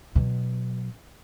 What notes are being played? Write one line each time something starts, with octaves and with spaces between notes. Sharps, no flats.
B2 F#3